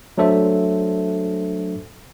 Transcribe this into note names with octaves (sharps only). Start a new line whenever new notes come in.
F#3 A3 D4 A4 C5 E5